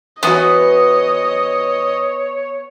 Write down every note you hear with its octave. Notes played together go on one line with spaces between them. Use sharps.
E3 B3 F#4 C#5 D#5 D#6